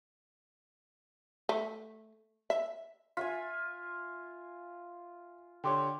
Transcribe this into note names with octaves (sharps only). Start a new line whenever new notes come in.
A3
E5
F4 E5 G#5 B6
D3 G4 C#5 G5 C6 D6